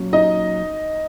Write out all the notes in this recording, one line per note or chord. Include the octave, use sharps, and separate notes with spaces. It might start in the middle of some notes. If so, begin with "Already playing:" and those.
Already playing: A#2 F#3 C#4
D#4 D#5